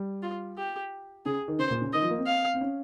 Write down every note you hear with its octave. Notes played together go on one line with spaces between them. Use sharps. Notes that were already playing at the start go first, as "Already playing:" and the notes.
Already playing: G3
F4
G4
C#3 G#4
D#3
C#3 C5
A#2
C#3
D#3 D#5
F3
A#3
C4
F5
C4
C#4